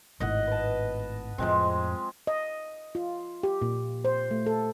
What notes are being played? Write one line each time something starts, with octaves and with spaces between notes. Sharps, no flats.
G#1 A2 D#5 F#5
B4 A5
F2 A2 F3 G#3 C4
D#5
F4
G4
A#2
C5
A3
A4